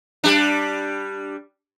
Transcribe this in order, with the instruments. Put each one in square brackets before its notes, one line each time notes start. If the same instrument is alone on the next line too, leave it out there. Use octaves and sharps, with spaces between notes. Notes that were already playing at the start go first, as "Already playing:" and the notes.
[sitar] G3 D4